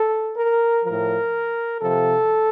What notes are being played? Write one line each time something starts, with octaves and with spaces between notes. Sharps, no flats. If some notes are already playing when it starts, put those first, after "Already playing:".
Already playing: A4
A#4
A2 F3 A#4
C3 F3 A4